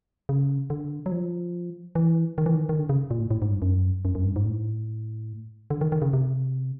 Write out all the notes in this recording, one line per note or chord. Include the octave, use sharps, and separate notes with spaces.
C#3
D3
F#3
F3
E3
D#3
E3
D#3
D#3
D3
C#3
A#2
A2
A2
G#2
G2
F#2
F#2
F#2
G2
G#2
A2
D3
D#3
D#3
C#3
C3